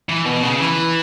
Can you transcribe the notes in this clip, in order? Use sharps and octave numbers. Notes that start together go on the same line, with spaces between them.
E3
B2
C#3
E3